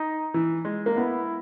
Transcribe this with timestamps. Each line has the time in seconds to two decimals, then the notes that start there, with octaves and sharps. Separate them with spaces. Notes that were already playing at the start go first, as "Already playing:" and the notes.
Already playing: D#4
0.34 E3
0.65 G#3
0.86 A#3
0.96 B3 E4